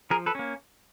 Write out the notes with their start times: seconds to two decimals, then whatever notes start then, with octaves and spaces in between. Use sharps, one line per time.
0.10 F3 G#4 A#4
0.26 A4 B4
0.35 A#3 C#4